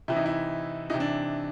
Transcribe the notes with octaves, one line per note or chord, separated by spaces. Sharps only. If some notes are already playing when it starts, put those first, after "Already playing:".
C3 E3 E4
D#4
E4
C3 E3 D#4
D4